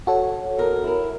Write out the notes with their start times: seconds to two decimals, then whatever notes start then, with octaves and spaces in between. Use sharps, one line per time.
0.07 F#4 A4 C#5
0.58 E2 A#4
0.84 E4 A#4